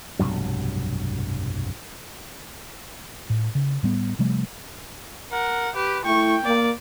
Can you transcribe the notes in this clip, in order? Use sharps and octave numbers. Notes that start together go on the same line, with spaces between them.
F1 B1 G2 F#3
A2
C#3
A2 G3 B3
C3 F3 G3 A3
A#4 F#5
G4 B4
A3 E4 G5 C#6
A#3 D5